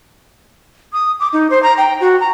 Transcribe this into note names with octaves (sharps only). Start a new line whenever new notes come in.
D#6
D6
D#4
C5
A#5
G5
F#4
A#5